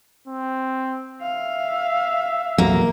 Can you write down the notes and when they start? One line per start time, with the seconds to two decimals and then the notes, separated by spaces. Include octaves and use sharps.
0.28 C4
1.22 E5 F5
2.58 A#1 E2 F#3 A#3